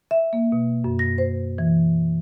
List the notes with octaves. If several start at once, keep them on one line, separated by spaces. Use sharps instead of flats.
E5
A#3
B2
F#2
A#6
C5
E3